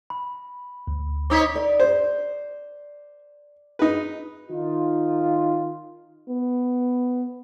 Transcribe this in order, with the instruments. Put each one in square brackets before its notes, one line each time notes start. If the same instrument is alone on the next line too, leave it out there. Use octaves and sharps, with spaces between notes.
[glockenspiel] B5
[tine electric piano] D2
[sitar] C4 D#4 C#5 [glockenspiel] D6 D#6 B6
[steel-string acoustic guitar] D5
[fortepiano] C5
D#4 B4
[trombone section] D#3 D#4 F4
[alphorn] B3